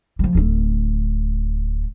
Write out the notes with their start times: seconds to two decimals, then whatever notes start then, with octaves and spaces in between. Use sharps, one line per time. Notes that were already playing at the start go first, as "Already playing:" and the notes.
0.19 F3 G3
0.35 D1 A3